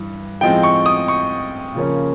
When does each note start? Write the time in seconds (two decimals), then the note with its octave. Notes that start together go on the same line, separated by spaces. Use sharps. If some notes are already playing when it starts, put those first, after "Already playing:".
Already playing: G2 E3
0.41 A2 F3 G#3 C4 G5
0.63 C#6
0.86 D#6
1.08 C#6
1.75 C#3 F3 A#3 C#4